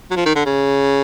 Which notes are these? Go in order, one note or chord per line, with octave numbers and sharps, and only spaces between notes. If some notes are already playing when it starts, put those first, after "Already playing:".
F#3
F3
D#3
D3
C#3